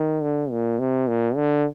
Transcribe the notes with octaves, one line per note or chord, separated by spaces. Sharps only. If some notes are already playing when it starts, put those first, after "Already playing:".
Already playing: D#3
D3
A#2
C3
A#2
D3